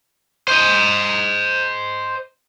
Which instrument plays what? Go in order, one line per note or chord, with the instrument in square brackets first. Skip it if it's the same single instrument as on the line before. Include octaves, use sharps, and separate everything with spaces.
[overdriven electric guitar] C5 D#5